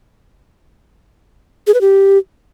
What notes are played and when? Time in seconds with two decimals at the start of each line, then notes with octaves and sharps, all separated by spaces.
1.67 G#4
1.74 B4
1.81 G4